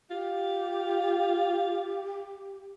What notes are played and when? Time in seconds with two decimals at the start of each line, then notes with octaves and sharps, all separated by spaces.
0.10 F4 G4